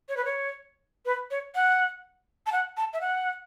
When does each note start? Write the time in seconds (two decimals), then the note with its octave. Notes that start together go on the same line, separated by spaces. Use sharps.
0.09 C#5
0.17 B4
0.25 C#5
1.06 B4
1.31 C#5
1.55 F#5
2.46 A5
2.52 F#5
2.77 A5
2.93 E5
3.01 F#5